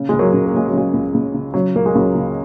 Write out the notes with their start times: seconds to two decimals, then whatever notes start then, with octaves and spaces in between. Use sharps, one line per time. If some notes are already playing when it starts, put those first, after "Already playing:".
Already playing: C#3
0.09 C#2 G#3
0.19 F#3 A#3
0.34 C#2
0.46 A#3
0.53 C#3 G#3
0.67 F#3
0.73 C#3 G#3
0.93 C#2
1.14 C#2
1.34 C#3
1.54 C#3 F#3
1.75 C#2 A#3
1.86 G#3
1.95 C#2 F#3
2.15 C#3